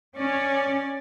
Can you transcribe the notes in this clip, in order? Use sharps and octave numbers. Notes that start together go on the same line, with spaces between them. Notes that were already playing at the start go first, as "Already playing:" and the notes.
C#4 D5 G#5